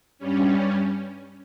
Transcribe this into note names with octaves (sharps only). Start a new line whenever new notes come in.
G2 G3 C#4